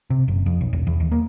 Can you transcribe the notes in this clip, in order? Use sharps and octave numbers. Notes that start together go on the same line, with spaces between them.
C3
F#1
F2
B1
E1
E2
D#2
A#3